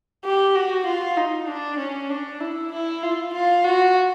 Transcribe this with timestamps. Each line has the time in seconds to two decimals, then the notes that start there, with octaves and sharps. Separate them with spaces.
0.24 G4
0.55 F#4
0.86 F4
1.17 D#4
1.48 D4
1.79 C#4
2.09 D4
2.41 E4
2.72 E4
3.03 F4
3.33 F4
3.64 F#4